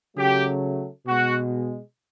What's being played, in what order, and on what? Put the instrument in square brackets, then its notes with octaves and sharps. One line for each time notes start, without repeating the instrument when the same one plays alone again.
[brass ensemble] C#3 F#3 A3 G4
B2 G#3 F#4